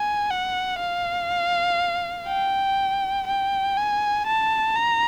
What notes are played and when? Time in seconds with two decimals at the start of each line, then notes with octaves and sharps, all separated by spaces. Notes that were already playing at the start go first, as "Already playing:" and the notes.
Already playing: G#5
0.30 F#5
0.80 F5
2.28 G5
3.27 G5
3.77 G#5
4.27 A5
4.76 A#5